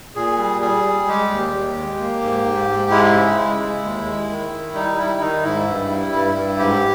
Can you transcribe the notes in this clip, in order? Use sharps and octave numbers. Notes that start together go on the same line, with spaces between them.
A#2 G#4
G3
G3 G#4
G3
G#3 G4
D#2
D#2
G#3
A#3
G#2
G#2
G#2
G#3 E4
C#3
G#3
G#3
D#2
G#3
D#3
D#3
G3 D#4
G3 E4
D#3 D#4
G#2 E4
G2
G3
G2
G2
G#2 G4